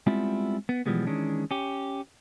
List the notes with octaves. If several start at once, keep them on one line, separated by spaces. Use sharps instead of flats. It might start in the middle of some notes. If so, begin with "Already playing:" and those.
G3 G#3 B3 C4 E4 F4
B3
B2 E3 F3 G3 G#3 B3
D#3 E3 G#3 C#4 D4
C#4 G4